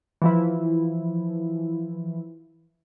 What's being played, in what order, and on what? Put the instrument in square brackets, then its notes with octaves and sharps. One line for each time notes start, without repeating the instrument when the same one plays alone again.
[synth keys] E3 F3 E4